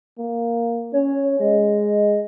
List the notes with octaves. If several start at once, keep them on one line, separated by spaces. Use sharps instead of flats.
A#3
C#4 C#5
G#3 D#5